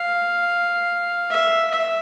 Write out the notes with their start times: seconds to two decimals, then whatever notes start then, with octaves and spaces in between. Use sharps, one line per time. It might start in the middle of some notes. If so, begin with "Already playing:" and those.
Already playing: F5
1.30 E5
1.70 E5